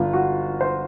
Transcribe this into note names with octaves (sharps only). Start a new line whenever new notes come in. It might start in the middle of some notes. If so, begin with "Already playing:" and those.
Already playing: G1 F4
F#4
C5